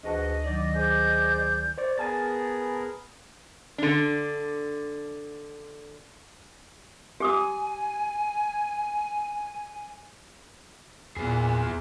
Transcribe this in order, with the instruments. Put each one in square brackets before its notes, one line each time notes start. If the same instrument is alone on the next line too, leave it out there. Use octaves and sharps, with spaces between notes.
[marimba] D2 A5 [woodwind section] G#2 E3 F#4 [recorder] D#5
[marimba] D#3 F#3 D#4 [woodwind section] D5
[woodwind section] G#4 C5 D5 [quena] G6
[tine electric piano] C5 D5
[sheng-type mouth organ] B3 G#4 A#4 [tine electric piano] G#5 A5 A6
[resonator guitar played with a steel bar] D3 D4
[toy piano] G4 D6 D#6 [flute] G#5
[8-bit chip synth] E2 [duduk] A#2 [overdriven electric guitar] B3 G#4